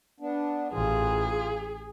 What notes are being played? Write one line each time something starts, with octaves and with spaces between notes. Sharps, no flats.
B3 D4
A1 E3 F4 G#4